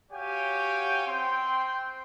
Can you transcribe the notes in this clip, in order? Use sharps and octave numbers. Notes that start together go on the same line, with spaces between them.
F#4 G4 C#5 F5 G5 G#5
C4 G5 C6